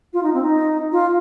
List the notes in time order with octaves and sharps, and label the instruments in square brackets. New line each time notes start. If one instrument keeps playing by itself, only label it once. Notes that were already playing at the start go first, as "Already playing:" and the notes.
[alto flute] F4
D#4
C4
D#4
F4